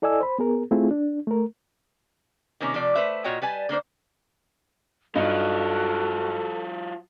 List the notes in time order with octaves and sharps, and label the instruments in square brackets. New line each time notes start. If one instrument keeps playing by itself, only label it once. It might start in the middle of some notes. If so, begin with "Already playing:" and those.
[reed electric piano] E4 A4 D5 D#5 G#5 E6
C5 B5
B3 G#4 A#4
A3 C4 E4 F4 G#4
D4
A3 A#4
[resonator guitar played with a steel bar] C3 D#3 A#3 C#4
C3 F3 A3 D5
A3 B4 C5 E5
A#2 F4 F#4 C#5 D#5 G5
G3 B4 G#5 A5
D3 A#3 D4 C5
[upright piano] G2 D#4 [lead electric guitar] F#3 F4 [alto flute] F#4 [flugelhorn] A4